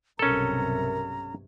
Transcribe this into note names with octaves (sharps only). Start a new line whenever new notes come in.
B1 G2 C3 C#4 A4 A#4 A#5